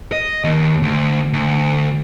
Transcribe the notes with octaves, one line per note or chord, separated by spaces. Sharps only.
D#5
D#2
D2
D2